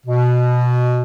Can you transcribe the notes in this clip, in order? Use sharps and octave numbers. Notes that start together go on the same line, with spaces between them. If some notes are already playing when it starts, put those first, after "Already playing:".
B2